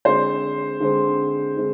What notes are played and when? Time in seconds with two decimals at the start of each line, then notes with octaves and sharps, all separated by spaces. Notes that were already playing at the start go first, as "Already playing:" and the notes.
0.05 D3 G#3 C4 C5
0.80 D3 G#3 C4
1.57 D3 G#3 C4